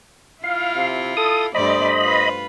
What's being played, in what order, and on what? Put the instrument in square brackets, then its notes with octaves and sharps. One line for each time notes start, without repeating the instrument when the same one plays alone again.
[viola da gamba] E4 F4 [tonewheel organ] F5
[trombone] C3
[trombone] A4 [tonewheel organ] D#6
[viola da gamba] G2 A3 D5 [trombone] C5 [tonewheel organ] D#5 B5
[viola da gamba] F4 B4